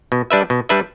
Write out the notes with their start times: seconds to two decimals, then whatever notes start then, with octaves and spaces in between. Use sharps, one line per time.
0.12 B2
0.30 G3 D4 B4 E5
0.50 B2
0.69 G3 D4 B4 E5